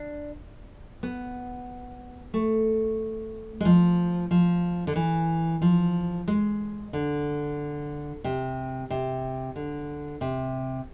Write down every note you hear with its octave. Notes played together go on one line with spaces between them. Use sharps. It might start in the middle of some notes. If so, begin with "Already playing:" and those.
Already playing: D4
B3
A3
G#3
F3
F3
D3
E3
F3
G#3
D3
C3
C3
D3
C3